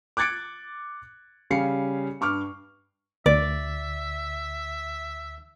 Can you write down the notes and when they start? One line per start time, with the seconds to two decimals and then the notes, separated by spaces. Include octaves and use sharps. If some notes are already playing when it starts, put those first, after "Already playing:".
0.17 D6 F#6 G#6 A6 C#7 D7
1.50 C#3 G3 C#4 F5 C7 C#7
2.21 G2 C#6 D6 F6
3.26 D2 D5 E5